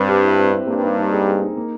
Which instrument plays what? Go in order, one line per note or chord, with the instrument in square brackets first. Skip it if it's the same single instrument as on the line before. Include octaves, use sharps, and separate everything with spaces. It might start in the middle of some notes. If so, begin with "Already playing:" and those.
Already playing: [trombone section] G2 [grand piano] C4 B4
[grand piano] G4
E4
C4
C4
[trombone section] G2 [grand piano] A#3
[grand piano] D#4
D#4
G#4
G#4
D#4
A#3